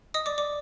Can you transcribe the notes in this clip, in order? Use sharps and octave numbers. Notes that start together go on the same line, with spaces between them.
D#5 D#6
D5 D6
D5 D6